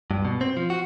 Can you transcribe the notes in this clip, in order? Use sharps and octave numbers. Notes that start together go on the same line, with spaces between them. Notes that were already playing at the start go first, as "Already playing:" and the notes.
G2
B2
C4
F3
F#4